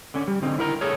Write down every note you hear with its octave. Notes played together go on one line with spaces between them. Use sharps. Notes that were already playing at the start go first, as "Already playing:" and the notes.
D3 C#4
G3
D3 C4 D#4
E4 A#4 A#5
A3 G#4 A4 C#5